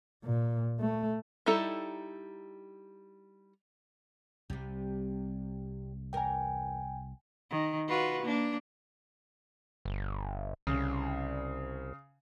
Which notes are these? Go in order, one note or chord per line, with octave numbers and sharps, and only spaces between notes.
A#2
A3
G3 D#4 E4 A4 A#5
C2 C3 G3
E2 A#4 G5 G#5
D#3
F4 F#4 B4
A#3 D4
G1
C2 C#3